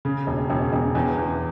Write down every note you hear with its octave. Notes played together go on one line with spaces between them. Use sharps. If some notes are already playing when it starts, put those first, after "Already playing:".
C#3
E1
E1
E1
E2
E2